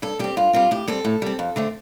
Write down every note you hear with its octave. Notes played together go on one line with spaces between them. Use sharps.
G2 A4
G3 C4 G4
G2 F4
G3 C4 F4
A2 G4
G3 C4 A4
A2
G3 C4
F2
D3 A3 C4